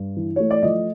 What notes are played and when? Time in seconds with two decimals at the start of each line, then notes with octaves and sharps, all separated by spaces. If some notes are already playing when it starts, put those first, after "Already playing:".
Already playing: G2
0.17 E3
0.36 A3 C#5
0.51 D5
0.63 F3 D#5